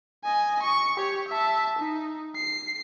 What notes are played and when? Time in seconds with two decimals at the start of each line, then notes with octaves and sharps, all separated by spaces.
0.24 D#5 G#5
0.62 C#6
0.96 G4 C#5
1.28 E5 A5
1.79 D#4
2.36 C7